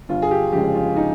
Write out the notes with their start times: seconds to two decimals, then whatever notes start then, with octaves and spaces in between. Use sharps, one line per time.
0.09 G1 F4
0.22 G#4
0.31 G4
0.52 F2 C#3 G#3 G4
0.75 F4
0.96 D#4